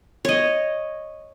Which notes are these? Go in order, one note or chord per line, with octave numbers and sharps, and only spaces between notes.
C#5 D#5